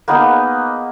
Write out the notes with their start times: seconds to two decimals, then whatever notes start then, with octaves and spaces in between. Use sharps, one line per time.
0.08 A#3 B3 D#4 G#4